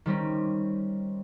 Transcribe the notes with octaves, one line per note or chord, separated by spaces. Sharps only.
D#3 G3 C4 C#4